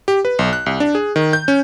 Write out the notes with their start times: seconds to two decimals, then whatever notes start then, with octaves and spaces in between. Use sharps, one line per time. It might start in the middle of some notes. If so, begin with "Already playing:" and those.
0.08 G4
0.25 B4
0.39 B1
0.53 F#6
0.66 C2
0.80 D4
0.95 G#4
1.16 D#3
1.33 G6
1.48 C#4